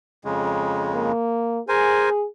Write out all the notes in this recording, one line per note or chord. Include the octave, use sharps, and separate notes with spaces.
F2 C#3 G#3
A#3
G#4 A#4 C5 G#5